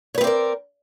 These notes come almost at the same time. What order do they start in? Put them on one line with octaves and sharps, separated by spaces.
C#5 B4 C4 D5 A#4